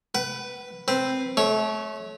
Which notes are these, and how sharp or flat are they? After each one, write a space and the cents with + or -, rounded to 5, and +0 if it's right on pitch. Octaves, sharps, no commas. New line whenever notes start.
B4 +0 F#5 +40
C4 +0 B4 +0
A3 -30 C#5 +0